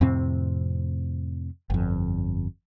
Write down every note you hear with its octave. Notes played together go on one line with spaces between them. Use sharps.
F2 A2 C3 C4
G1 F2